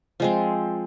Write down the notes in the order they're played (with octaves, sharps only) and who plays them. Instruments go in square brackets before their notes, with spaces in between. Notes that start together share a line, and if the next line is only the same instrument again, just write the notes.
[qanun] F3 G#3 C4